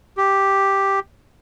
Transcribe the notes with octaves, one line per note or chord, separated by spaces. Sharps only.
G4